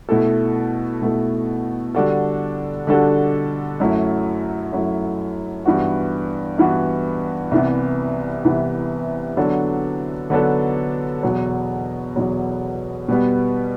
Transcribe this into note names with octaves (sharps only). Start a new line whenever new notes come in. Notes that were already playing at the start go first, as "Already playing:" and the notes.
B2 A3 E4 A4
B2 A3 E4 A4
D3 G3 D4 F#4 A4
D3 G3 D4 F#4 A4
F#2 F#3 A3 E4
F#2 F#3 A3 E4
G2 E3 B3 F#4
G2 E3 B3 F#4
C2 C3 E3 B3
C2 C3 E3 B3
D3 F#3 B3 D4 A4
D3 F#3 B3 D4 A4
E2 B2 F#3
E2 B2 F#3
B2 G3 B3